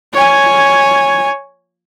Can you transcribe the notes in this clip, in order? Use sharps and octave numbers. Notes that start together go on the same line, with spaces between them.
C#5 G#5